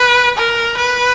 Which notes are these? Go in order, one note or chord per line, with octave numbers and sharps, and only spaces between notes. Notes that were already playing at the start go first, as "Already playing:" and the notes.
Already playing: B4
A#4
B4